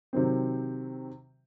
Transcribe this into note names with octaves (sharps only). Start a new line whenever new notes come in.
C3 D#3 F#3 C4